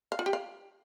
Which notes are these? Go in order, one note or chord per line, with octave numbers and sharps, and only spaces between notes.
F5
F4
G4
F5